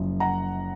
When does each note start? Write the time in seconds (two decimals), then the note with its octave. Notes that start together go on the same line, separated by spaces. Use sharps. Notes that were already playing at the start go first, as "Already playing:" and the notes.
Already playing: F#1 F#2 F3
0.20 F#5 A#5